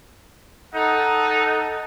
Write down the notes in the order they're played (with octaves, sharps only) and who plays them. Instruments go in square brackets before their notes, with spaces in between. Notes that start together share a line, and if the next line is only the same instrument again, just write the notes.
[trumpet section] D#4 [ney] A4 [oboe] F#5